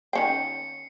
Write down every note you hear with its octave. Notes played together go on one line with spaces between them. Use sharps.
D#3 C#4 G5 C7 C#7